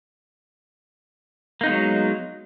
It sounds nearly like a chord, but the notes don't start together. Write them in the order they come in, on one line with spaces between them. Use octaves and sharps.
A#3 D#4 B3 G#3 F#3